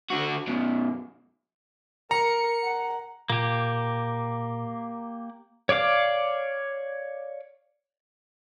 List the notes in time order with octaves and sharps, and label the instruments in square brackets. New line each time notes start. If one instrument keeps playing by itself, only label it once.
[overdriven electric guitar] D3 F#4
F#2 B2
[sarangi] A#4 [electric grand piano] A#5 [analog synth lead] C#7
[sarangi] F#5
[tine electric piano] A#2 [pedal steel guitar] A#3 G4
[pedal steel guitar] C#5 D5 F5 D6